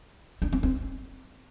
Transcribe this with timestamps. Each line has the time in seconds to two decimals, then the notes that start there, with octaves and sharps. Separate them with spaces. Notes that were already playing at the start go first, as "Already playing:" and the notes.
0.42 D4
0.53 C4
0.63 C4